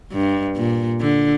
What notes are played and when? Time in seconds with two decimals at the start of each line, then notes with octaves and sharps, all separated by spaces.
0.12 G2
0.56 A#2
1.00 D3